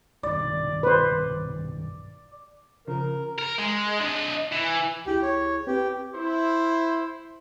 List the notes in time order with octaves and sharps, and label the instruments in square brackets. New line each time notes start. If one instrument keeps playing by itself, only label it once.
[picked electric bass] B1 G2 D#3 [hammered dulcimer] D5
[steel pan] B4 C5
[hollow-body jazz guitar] C#3 F3 [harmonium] A#4
[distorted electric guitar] A#4
G#3
D4 D#5
E3
[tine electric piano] C#2 E4 G#4 [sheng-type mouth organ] G4
[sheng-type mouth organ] C#5
[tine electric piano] C4 B4 [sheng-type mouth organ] G4
[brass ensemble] E4 [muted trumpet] C5